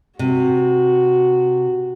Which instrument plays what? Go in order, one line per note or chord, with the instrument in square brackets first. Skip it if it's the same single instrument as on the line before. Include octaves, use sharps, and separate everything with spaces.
[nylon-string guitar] C3 [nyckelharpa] F#4